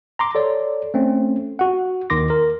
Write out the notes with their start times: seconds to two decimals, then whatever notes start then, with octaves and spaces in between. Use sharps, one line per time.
0.19 A#5 C6 D6
0.35 A4 C#5 D5
0.94 A3 C4 C#4
1.59 F#4 F#5
2.10 D#2 D#3 C6 D6 A#6
2.30 A#4